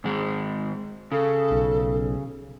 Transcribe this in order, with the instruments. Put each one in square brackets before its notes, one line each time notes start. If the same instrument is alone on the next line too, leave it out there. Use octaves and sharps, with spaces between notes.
[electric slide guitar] G#2 D#3 G#3
[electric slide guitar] C#3 [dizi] A4
[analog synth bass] B1